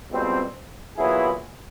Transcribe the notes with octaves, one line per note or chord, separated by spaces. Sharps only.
C#2 B2 G3 C4
A#2 F#3 B3 E4 G#4